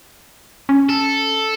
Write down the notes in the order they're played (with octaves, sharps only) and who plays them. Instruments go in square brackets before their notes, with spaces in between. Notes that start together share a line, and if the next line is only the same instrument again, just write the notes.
[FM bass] C#4
[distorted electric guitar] A4